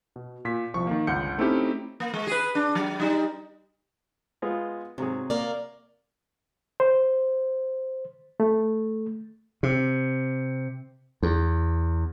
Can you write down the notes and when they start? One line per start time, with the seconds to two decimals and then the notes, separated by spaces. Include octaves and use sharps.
0.16 B2
0.45 A#2 B6
0.74 C2 F3 C#6
0.87 D#3 A#3
1.07 G1 C#2 F#5 G6 C#7
1.38 A3 C4 C#4 D#4 E4 G4
2.00 A#3
2.14 G#3
2.27 G#4 B4
2.55 D4
2.75 F#3
3.00 G3 D#4
4.42 G#3 B3 F4
4.98 G#2 C3 F#3 G#4
5.30 A#3 A#4 D5
6.80 C5
8.40 A3
9.63 C3
11.23 E2